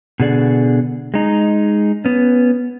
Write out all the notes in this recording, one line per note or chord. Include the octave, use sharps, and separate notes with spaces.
B2 D3 G#4 D5
G#3 D#4
B3 C#4